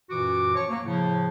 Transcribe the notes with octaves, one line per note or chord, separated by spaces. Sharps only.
F#2 A#2 E3 F#4 D6
F3 C#5 C#6
F#3 A#3
A2 C#3 F3